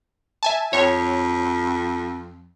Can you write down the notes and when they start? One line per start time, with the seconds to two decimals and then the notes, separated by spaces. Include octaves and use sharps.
0.43 E5 G#5 A5
0.73 F2 C#5